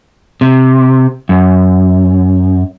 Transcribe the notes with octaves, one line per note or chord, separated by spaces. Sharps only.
C3
F#2